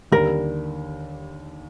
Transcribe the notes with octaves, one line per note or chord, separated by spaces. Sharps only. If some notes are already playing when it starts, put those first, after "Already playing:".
D#2 D3 G3 A#4